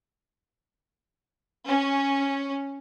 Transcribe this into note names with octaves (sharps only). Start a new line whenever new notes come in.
C#4